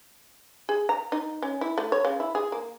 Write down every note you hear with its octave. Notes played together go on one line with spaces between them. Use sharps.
G#4
A#5
D#4
C#4
E4
A3
C#5
C#3
E4
G#4
A#3